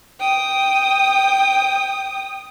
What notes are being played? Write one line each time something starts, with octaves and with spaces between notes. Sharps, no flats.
G5 D#6